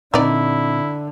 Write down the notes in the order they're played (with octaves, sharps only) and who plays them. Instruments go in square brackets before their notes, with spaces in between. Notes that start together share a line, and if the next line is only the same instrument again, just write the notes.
[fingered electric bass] A#2 C4 [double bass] D3 [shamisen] D#4 D5 [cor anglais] E4